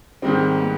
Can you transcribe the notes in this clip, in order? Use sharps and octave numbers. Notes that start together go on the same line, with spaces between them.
G#2 D#3 G3 C4
B3